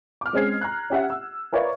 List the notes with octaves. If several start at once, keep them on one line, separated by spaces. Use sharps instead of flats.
D6 F6
G#3 C4 C#4 G#4 G#6 C7
A#5 F#6
C#4 G4 E5 F#5
E6
A#4 B4 C#5 D5 E5 F5